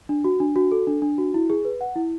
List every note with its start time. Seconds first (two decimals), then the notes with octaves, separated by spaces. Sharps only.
0.09 D4
0.24 F#4
0.40 D4
0.56 F#4
0.72 A4
0.87 D4
1.02 D4
1.18 F#4
1.34 E4
1.50 G#4
1.65 B4
1.81 F#5
1.96 E4